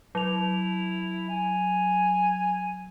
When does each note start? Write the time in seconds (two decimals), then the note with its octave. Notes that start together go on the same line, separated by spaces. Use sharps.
0.15 F#3 E4 F7
1.29 G#5